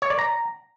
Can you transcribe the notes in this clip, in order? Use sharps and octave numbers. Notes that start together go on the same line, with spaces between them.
C#5
D5
A#5